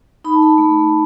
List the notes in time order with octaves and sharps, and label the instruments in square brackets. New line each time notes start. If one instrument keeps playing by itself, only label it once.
[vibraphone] D#4 B5
A5
B5
A3